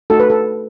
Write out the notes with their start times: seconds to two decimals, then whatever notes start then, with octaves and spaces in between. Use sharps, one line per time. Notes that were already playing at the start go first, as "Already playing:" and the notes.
0.10 A3 D#4 F#4 A4
0.20 B4
0.30 A4